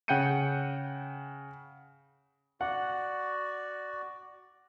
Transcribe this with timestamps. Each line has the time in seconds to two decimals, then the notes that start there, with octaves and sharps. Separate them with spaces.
0.08 C#3 F#5 G5 G6 C#7 D#7
2.61 F#4 D5 F#5